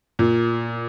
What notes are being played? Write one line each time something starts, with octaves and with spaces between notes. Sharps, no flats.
A#2